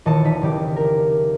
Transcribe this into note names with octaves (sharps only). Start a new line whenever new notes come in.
D#1 E3 D#5 A5 C#7
E1 D#4 D#5 B6
F1 C#3 G4
A#4